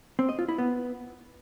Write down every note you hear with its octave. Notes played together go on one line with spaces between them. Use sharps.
C4
D#5
F4
E4
B3